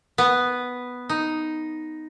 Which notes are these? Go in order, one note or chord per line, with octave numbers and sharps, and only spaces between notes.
B3
D#4